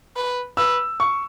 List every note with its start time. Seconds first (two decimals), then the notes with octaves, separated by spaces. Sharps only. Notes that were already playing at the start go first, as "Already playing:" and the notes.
0.16 B4
0.57 B4 E6
1.00 C#6